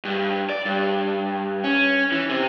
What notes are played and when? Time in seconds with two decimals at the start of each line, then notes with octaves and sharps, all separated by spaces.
0.05 G2
0.49 D5
0.65 G2
1.64 C#4
2.12 E3
2.29 C3